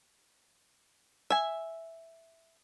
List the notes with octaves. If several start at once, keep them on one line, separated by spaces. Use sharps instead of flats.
E5 G#5